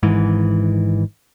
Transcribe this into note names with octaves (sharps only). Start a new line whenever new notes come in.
G#1 G#2 E3